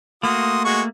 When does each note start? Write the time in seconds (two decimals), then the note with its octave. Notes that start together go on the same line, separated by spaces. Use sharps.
0.23 A3 A#3 F#4 C6 D#6
0.65 G#3 F#4 C#6